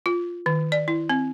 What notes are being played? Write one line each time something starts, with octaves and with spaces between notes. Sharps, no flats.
F4
D#3
D5
E4
C4